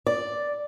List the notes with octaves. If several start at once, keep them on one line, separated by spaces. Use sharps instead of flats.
D5